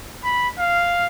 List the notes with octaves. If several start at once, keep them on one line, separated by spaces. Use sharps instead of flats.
B5
F5